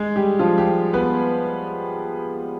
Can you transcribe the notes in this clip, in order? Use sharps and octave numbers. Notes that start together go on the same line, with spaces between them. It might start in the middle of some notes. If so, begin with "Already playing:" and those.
Already playing: G#3 G#4
G3 G4
F3 F4
G3 G4
B3 B4